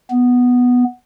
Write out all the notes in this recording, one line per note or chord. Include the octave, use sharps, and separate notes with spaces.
B3